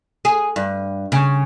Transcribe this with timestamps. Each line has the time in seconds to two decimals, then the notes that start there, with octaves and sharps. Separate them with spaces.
0.25 G#4
0.56 G2
1.12 C#3